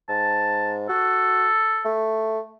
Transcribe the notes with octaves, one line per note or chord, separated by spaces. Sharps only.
G#2 A5
F#4 A4
A3